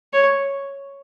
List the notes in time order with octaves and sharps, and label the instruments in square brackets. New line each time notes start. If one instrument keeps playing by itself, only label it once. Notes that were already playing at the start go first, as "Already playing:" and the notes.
[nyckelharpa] C#5